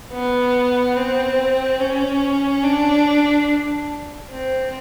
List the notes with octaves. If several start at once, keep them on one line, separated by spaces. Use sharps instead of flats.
B3
C4
C#4
D4
C4